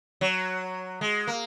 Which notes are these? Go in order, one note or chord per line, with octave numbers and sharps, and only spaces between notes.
F#3
G#3
A#3